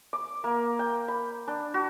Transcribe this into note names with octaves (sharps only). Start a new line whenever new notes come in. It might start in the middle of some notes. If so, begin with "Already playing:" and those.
D6
A#3
G5
B5
D4
F#4